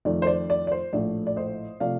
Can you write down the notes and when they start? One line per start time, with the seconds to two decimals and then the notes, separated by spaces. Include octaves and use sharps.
0.05 F2 D#3 A3 D5
0.22 C5
0.27 D5
0.50 D5
0.67 D5
0.72 C5
0.93 A#1 A2 A3 D5
1.27 D5
1.36 C5 D#5
1.80 C3 F3 A3 D5 F5